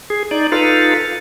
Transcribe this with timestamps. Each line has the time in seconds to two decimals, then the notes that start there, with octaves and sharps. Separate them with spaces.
0.10 G#4
0.31 D#4 D5
0.52 D#4 F4 A4 B4 F5